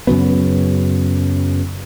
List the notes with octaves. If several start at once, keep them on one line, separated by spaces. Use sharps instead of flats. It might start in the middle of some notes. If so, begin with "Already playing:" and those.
F#2 C#3 F#3 B3